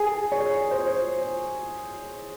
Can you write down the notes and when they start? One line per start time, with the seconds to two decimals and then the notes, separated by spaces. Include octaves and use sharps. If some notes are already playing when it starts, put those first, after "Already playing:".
Already playing: G#4
0.32 C#5
0.71 C5